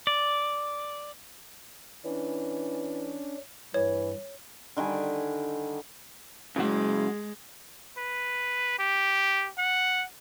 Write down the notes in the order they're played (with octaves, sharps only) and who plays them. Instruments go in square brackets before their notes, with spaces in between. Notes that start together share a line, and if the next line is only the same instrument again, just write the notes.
[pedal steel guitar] D5
[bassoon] E3 [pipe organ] C#4 D4
[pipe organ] G2 [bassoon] E3 [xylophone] C#5
[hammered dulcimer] D3 D#3 G3 G#5
[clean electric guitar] C#3 F#3 F#5 [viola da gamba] G#3
[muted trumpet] B4
G4
F#5